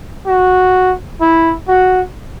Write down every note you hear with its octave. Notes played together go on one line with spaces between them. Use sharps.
F#4
E4
F#4